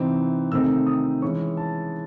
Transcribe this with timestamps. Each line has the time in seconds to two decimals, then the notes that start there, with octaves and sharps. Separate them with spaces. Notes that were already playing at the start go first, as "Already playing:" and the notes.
Already playing: C3 E3 C4 D#4
0.52 C3 D#3 A3 C4 D#4 E6
0.86 D#6
1.22 E3 G#3 C#4 C#6
1.57 A5